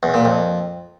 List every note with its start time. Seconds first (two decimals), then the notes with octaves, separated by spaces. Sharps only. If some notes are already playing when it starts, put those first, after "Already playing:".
0.03 E2
0.14 A#2
0.25 F2